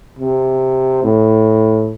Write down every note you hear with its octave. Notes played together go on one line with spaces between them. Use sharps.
C3
A2